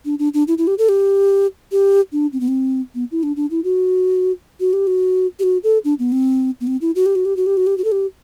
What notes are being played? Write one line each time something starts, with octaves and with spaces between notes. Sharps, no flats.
D4
D4
D4
E4
E4
G4
A4
G4
G4
D4
C4
B3
C4
B3
E4
D4
D4
E4
F#4
F#4
G4
F#4
G4
F#4
A4
D4
B3
C4
B3
C4
E4
F#4
G4
F#4
G4
F#4
G4
F#4
G4
F#4
A4
G4